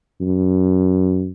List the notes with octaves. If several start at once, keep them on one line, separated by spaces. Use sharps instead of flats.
F#2